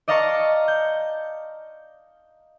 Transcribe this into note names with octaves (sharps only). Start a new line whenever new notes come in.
D5 D#5 F5 A5 A#5 C#6
G6